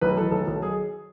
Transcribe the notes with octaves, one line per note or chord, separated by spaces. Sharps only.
B1 B4
E3 A4
B1 A4
B1
G#4